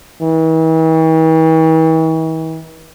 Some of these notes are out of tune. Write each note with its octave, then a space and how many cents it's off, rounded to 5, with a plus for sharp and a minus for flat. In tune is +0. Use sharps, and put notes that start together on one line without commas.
E3 -45